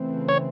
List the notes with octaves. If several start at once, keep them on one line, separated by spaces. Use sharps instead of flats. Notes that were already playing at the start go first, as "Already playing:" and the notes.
Already playing: C#3 E3 A3 C4
C#5